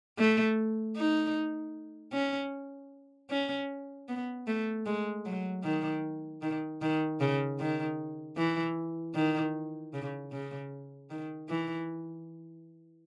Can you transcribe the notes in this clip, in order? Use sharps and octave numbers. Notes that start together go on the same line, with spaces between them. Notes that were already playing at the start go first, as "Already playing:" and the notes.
A3
D#4
C#4
C#4
B3
A3
G#3
F#3
D#3
D#3
D#3
C#3
D#3
E3
D#3
C#3
C#3
D#3
E3